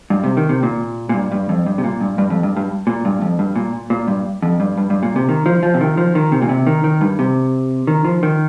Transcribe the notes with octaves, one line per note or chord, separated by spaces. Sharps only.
G2
C3
D#3
C3
A#2
A#2
G2
G2
F2
G2
C3
A#2
G2
G2
F2
G2
G2
A#2
G2
F2
G2
A#2
A#2
G2
F2
G2
G2
G2
A#2
C3
D#3
F3
F3
C3
D#3
F3
D#3
C3
A#2
C3
D#3
D#3
G2
C3
D#3
F3
D#3